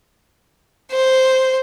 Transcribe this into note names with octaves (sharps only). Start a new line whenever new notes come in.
C5